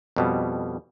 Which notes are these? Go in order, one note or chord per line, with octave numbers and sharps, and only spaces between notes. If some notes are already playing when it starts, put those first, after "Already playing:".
F2 B2 G3